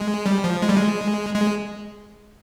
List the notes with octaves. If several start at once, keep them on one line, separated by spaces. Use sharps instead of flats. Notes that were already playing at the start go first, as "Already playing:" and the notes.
Already playing: G#3
G3
F3
G#3
G3
G#3
G#3